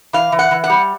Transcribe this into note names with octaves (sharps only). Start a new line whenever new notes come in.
E3 F5
E3
F#5
E3
F#5
G3